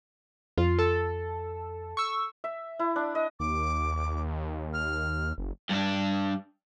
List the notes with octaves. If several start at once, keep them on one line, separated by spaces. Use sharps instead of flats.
F2 F4
A4
C#6 E6
E5
E4
D4
D#5
D#2 D6
F6
F#1
G2 D4